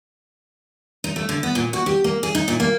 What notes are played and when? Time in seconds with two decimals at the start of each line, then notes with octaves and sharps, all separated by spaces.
1.04 D#4
1.16 A3
1.29 D3
1.43 B3
1.55 A#2
1.73 F#4
1.86 G4
2.04 A#3
2.23 G#4
2.35 D#4
2.48 A#2
2.60 A#3